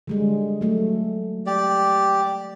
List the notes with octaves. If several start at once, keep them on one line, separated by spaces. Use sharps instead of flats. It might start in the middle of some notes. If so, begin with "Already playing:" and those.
D3 G3 G#3
F#3 A3
G4 D5